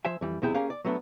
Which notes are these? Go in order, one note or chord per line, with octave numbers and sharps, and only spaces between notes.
F3 C5 E5 G#5
F2 E3 G3
B1 E2 C3 E4 G#4 G5
A#3 C#4 G4 G#4 F5
D5
F#3 A3 B3 C4 D4